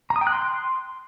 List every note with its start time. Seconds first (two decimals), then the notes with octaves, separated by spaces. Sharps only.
0.10 A#5
0.16 D#6
0.21 G5
0.27 F#6
0.32 C6